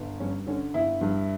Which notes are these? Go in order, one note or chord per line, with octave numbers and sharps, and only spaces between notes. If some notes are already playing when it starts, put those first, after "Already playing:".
Already playing: G1
G2 C#4
D3 C#4
G1 E4
G2